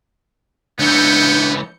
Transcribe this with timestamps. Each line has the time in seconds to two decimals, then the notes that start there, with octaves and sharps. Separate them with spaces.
0.79 C#2 E3 B3 D4 G6 C#7